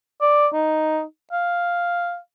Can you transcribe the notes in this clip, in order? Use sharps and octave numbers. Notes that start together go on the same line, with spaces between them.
D5
D#4
F5